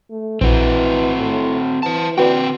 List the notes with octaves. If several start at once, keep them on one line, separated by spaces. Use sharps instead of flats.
A3
A#1 E3 C4 F#4
A2
E3 C5 A5
D3 C4 F#4 B4 D5 G5